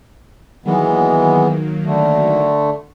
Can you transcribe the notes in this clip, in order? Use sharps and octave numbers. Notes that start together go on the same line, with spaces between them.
D#3 E3 F#3 G#3 A#3 B3
D3 A3